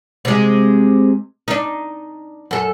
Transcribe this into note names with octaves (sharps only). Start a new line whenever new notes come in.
C3 G#3
D4 D#4
F#2 A4